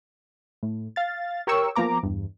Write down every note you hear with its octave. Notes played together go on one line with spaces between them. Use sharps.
A2
F5 A6
G4 A#4 C#5 G5 C#6 E6
F3 A#3 B3 A#5 D6
E2 G2